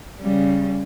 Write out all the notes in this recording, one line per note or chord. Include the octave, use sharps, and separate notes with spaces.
C#3 G3